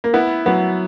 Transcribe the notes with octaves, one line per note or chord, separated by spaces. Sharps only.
A#3
B3 E4
F#3 B3